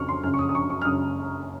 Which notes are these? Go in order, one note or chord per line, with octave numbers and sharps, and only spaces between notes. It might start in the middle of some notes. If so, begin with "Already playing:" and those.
Already playing: F2 C#3 C#6 F6
C6
F#2 C#3 F6
C#6
D#6
D#6
C#6
C#6
F6
F#2 C#3 D#6